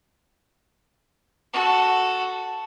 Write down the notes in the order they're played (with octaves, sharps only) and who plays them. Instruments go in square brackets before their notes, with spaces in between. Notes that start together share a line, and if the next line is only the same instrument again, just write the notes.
[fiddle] F#4 A4